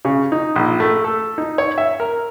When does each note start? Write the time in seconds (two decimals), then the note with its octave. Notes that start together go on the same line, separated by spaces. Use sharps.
0.05 C#3
0.32 D#4
0.56 A#1
0.80 A3
1.04 A4
1.38 D#4
1.58 C#5
1.78 E5
2.00 A#4